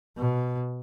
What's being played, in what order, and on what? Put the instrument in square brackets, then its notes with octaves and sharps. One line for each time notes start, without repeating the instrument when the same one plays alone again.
[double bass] B2